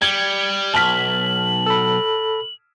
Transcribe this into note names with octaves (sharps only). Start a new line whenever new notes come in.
G3 G#6 C#7
B1 A5 F6 B6 F#7
A4 B5